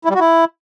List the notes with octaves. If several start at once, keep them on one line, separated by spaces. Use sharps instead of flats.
E4
G3
F#4
E4